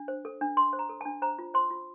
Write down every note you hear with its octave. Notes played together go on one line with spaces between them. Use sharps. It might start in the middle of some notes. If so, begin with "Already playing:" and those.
Already playing: D4
C5
A4
D4
D4 C6
C5
A#5
A4
D4 A5
C5 A#5
F4
C5 C6
F4